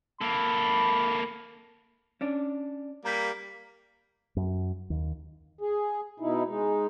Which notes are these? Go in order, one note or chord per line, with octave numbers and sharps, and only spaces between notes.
A#3 A4 B5
C#4 D4
G3 A#3 A#5 G6 B6
F#2
D#2
G#4
B2 D#4 E4
G#3 D#4